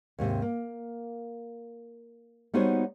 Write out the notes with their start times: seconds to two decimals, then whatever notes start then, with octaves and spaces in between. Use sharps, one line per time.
0.19 D#2 G#2 C3
0.42 A#3
2.54 G3 B3 D#4 F#4 C5 C#5